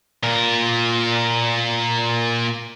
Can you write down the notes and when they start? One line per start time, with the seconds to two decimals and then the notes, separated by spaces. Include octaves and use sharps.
0.23 A#2 A#4